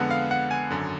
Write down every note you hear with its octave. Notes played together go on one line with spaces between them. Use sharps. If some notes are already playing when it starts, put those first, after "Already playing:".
Already playing: F2 D3 G#3 B3 F#5
F5
F#5
G#5
G#1 F#2 D3